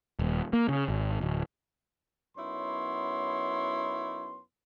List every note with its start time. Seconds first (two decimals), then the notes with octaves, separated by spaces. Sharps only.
0.19 D#1
0.53 A#3
0.69 C#3
0.88 G#1
1.21 D1
2.36 F#2 B3 D#4 E4 C#5 C6